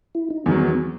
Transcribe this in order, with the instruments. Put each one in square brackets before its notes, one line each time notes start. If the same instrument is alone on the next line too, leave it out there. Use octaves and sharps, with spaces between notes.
[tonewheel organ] E4
D#4
[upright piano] E2 D#3 F#3 [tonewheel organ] B3
[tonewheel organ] B3